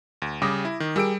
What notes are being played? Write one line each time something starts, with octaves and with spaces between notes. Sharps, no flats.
D2
C#3 G3 G4 D6 D#6 A#6
E4
D#3
G3 G4 G#4 A#4 E6 D7